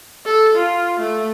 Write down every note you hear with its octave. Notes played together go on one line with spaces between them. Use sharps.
A4
F4
A3